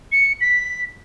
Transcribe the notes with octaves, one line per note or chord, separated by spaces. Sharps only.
C#7
B6